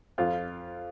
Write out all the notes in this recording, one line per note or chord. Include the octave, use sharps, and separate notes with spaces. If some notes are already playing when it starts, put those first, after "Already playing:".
F2 F4